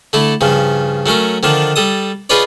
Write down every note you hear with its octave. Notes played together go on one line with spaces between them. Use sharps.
D3 A3 E4
G2 C#3 F3
F#3 A3 C#4 A#4
D3 D#3 F3 D4
G3 A4 D#6
D#4 F4 G#4 B4 C#5 D5